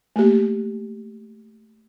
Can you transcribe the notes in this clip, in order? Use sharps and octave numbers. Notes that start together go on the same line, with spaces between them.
A3 A#3 G4